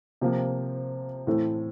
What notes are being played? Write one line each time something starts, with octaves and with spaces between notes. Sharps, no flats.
C3 F3 A#3
A2 E3 A3 C4